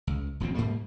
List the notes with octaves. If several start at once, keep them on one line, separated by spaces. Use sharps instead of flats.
C#2
D#1 F2 B2 C4
G#2 G3 A#3